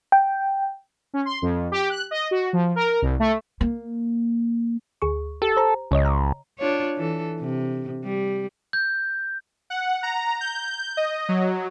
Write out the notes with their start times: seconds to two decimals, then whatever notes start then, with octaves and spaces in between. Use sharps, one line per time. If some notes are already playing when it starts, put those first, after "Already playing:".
0.12 G5
1.13 C#4
1.25 C6
1.42 F2
1.72 G4
1.90 F#6
2.11 D#5
2.31 F#4
2.53 F3
2.76 A#4
3.02 C2
3.20 A3
3.61 A#3
5.02 D2 G#4 C#6
5.42 G4 A4
5.57 C5 A#5
5.91 C#2 C#3 C#5 D#5
6.05 A#5
6.59 D4 F4 C#5
6.96 E3 A4
7.41 C3
8.05 G3
8.73 G6
9.70 F#5
10.03 A#5
10.41 G6
10.97 D#5
11.29 F#3